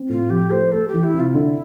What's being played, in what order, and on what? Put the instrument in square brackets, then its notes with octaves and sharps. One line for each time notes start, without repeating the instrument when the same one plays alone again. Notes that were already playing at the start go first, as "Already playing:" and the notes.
Already playing: [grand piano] C4
[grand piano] A2 [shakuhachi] F4
[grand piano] F3 [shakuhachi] G4
[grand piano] A3 [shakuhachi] C5
[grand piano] A3 [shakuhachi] A4
[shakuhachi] G4
[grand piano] E3
[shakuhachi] E4
[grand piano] C3
[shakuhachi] F4
[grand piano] D3 [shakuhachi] E4